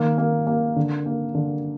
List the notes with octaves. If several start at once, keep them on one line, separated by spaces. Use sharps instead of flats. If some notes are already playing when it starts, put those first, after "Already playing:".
Already playing: D#3 A#3
A#3
A#3
D3
A#3
D3